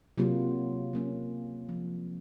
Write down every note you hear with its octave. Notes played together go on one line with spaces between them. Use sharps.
C3 F#3 A#3 F4
F#3 A#3 C#4
F3 G#3 C4